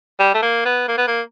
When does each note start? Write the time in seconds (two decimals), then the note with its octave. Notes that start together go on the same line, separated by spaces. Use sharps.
0.20 G3
0.34 A3
0.42 A#3
0.65 B3
0.88 A#3
0.98 B3
1.08 A#3